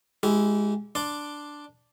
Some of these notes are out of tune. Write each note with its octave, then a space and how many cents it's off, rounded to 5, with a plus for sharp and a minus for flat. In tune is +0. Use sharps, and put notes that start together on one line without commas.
G#3 +0 E4 +0 G4 -30
D4 +0 D5 +0 C6 +0